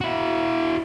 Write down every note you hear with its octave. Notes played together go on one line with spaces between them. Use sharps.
E4 F#4